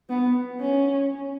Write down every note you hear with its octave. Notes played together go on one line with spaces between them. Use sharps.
B3
C#4